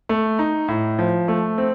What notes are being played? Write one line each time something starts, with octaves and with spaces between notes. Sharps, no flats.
A3
D#4
A2
F3
A3
C4